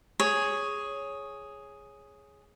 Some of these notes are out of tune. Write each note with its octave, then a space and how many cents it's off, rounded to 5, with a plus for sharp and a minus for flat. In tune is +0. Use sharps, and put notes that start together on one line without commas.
G#4 +0 C#5 +0